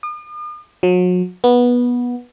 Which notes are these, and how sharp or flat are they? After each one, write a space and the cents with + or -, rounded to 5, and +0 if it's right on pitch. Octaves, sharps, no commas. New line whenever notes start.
D#6 -45
F#3 -40
B3 -15